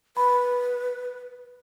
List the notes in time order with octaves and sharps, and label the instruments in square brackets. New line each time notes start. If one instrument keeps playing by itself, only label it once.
[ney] B4 [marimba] B5